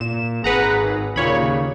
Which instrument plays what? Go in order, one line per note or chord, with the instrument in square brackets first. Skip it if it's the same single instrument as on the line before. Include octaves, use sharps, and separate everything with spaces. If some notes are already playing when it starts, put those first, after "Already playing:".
[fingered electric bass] A#2 [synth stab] E7
[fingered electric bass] G#1 [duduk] G#4 [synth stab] B4 F#5 A#5
[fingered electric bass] D#2 [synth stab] A#2 C#5 B5 [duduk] C#3